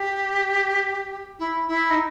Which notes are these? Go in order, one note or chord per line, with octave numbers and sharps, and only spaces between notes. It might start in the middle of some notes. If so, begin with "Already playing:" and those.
Already playing: G4
E4
E4
D#4